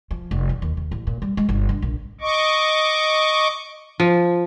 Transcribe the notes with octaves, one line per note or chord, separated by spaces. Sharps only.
F3
F1
E2
D#2
D#2
A1
A#2
G3
G#3
G1
D3
A#1
D#5 C#6 D6
F3